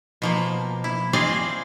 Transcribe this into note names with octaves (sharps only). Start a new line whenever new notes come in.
B2 F3 A#3
E4
C4 F4 G#4 D5 D#5 G#5